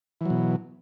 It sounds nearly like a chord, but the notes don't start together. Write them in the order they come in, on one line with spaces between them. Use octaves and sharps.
E3 F#3 B2